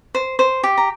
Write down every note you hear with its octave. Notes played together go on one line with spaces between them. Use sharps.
C5
C5
G4
A#5